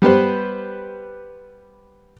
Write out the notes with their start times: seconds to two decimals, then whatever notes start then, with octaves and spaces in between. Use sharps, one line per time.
0.02 G3 B3 G4 B4 C5